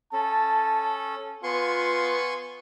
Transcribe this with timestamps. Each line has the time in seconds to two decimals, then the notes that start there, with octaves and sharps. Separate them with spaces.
0.13 C#4 A4 A5
1.43 B3 F4 G#5 C6 C#6